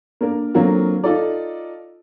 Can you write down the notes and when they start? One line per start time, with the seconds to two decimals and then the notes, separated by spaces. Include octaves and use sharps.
0.21 A#3 D4 A#4
0.54 D3 F#3 A#3 C4 F4 F#4
1.04 D#4 F4 A4 D5